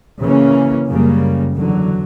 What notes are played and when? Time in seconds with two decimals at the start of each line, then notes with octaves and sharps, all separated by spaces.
0.21 C#3 E3 A#3 C#4
0.87 F#2 C#3 G3 A#3
1.54 E2 D3 F#3